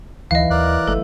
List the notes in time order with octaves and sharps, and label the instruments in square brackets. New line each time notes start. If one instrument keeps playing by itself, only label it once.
[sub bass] D2 [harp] E3 [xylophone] D#5 F5
[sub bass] D#2 [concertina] A#4 D5 F#6
[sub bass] G1 [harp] A3 [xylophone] A4